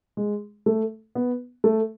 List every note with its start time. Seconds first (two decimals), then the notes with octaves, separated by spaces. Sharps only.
0.17 G#3
0.66 A3
1.15 B3
1.64 A3